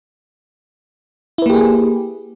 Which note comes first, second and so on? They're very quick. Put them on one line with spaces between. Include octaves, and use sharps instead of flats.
E4 B4 A#3 G4 G#4